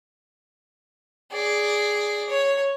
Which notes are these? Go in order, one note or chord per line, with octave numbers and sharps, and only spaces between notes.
G#4 D5
C#5